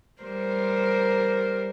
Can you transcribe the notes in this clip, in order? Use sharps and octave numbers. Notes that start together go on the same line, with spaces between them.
G3 A#4 C5